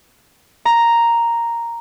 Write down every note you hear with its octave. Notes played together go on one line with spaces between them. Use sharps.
A#5